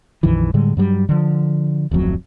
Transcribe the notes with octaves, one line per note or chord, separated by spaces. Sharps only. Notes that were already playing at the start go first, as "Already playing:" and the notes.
A#1 F2 D#3 E3
A2 D3 G3 G#3
G2 F#3 G3
D3 F3
D1 A1 F2 F#3